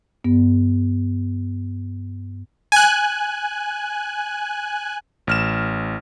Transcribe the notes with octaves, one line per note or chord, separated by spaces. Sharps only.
G2 B3
G#5 F#6
A1 F6 E7